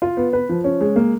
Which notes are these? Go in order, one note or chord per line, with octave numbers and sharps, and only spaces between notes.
F4
B3
B4
F3
C#4
G#3
A#3